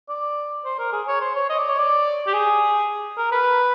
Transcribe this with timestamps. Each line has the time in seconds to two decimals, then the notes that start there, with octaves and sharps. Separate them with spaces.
0.09 D5
0.65 C5
0.79 A#4
0.92 G#4
1.07 C#5
1.21 C5
1.35 C#5
1.49 D#5
1.58 D5
1.69 C#5
1.78 D5
2.27 G4
2.33 G#4
3.17 A#4
3.32 B4